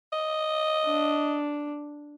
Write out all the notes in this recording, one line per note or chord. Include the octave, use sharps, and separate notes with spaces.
D#5
D4